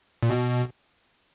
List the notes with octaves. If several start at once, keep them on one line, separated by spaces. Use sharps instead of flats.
A#2
B2